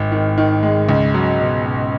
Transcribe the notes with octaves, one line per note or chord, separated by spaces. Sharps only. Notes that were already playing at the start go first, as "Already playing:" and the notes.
Already playing: G#1
D#3
D#3
G#3
C#2
F#3
B2
B2